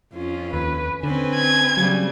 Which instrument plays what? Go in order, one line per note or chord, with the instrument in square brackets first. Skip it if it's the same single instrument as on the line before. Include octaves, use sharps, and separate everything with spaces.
[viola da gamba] F2 C#4 [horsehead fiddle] F4
[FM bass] D#2 [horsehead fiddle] B4
[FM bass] D3 [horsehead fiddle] C4 G#5 [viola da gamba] C#4 B4
[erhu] G#6
[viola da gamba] C#3 G3 [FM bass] F#3